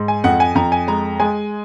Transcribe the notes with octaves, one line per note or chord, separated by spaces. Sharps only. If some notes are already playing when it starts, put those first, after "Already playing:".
Already playing: G#2
G#5
F2 F#5
G#5
F2 A#5
G#5
G#3 A#5
G#3 G#5